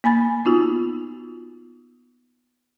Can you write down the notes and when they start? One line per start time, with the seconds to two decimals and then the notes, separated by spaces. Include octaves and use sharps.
0.04 A#3 G#5 B5 A6
0.45 B3 D#4 F4 F#4